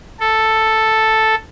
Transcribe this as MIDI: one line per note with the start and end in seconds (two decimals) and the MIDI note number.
0.20 1.35 69